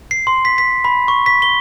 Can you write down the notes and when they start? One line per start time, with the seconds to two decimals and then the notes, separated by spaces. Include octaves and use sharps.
0.11 C7
0.27 C6
0.45 B6
0.58 B6
0.84 B5
1.08 C#6
1.26 B6
1.42 G7